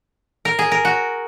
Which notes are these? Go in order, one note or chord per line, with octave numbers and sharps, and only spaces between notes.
A#4
G#4
A#4
F#4